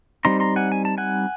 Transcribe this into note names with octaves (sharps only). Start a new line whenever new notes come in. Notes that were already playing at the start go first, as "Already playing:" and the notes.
G3 C4 D#4 A#5 C6
A#5 C6
F#5 G#5
G#5
A5
F#5 G#5